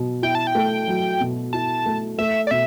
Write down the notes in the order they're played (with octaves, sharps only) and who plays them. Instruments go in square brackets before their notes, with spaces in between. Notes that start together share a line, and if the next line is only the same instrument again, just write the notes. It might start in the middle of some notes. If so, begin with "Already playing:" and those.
Already playing: [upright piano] B2 F#3
[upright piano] E4 [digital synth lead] G5
[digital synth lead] A5
G5
[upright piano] A3
F#3
B2
[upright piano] E4 [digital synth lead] A5
[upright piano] A3
[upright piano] A3 [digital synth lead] E5
[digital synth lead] D5
[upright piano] B2 [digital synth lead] E5